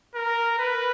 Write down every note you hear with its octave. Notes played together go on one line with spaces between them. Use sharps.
A#4
B4